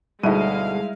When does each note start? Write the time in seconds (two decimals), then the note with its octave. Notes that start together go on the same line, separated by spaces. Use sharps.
0.23 D2 B2 G3 G#3 D#4 E4 F5 D#7